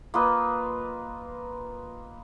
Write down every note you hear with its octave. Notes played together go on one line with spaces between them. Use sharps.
A#3 F4 B4 D#5